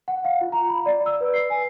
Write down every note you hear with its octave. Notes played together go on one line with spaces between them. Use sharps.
F#5
F5
F4
A#5
B5
D5
E6
B4
C7
G#5